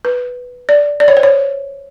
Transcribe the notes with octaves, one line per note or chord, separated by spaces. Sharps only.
B4
D5
D5
C#5
C5
C#5